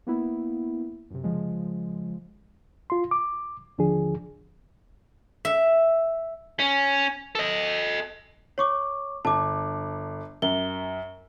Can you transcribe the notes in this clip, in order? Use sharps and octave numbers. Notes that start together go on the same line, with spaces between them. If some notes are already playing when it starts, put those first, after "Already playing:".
A#3 B3 E4
F#2 C3
C#3 F3 G#3
F4 C6
D6
D#2 D3 F3 D4 G#4
E5
C#4
A4 D#5
C#5 C#6 D6
G1 A5 D6
F#2 G7